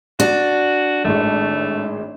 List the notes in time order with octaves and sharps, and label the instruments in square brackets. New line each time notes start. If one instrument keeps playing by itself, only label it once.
[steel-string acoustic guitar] D4 [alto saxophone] F#4
[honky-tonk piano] G#1 A2 G#3 [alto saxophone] A3